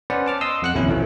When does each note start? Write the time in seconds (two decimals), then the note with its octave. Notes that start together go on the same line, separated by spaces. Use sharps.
0.10 B3 C#4 B4 C5 D5 F#5
0.26 A5 D6 F6
0.41 D#5 C6 D#6 E6
0.62 F2 F#5 F#6
0.74 A#1 D#2 C3 C#4 E4
0.88 B2 E3 F3 A3